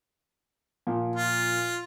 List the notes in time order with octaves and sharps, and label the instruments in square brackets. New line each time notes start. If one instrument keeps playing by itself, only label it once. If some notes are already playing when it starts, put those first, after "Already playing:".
[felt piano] A#2 F3
[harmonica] F4